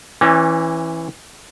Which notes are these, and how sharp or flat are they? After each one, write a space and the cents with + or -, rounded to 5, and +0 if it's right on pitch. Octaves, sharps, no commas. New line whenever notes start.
E3 +0 C#4 -35 D5 -10